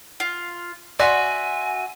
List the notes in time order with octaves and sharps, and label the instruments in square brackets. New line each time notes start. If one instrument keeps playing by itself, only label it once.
[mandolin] F4
[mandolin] F#4 E5 [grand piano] D5 F#5 C6 [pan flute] G#5